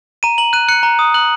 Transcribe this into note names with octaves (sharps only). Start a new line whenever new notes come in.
A#5 D#7
A#5 F#7
F#6 D#7
F#6 C#7
A#5
D#6
F#6 F#7